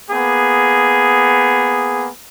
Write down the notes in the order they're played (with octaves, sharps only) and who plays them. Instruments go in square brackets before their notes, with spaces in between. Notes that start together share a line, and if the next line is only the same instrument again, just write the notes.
[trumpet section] A#3 B3 G#4